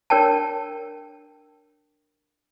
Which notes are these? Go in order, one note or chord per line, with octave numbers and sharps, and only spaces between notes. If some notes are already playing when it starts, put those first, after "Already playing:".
D4 A#4 C#5 G5 A5